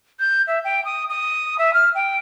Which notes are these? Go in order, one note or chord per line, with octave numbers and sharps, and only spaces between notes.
G6
E5
G5
D#6
D#6
E5
F6
G5